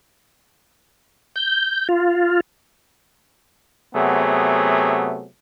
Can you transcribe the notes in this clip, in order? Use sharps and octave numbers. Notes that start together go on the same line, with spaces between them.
G6
F4
C3 F#3 A3 B3 G#4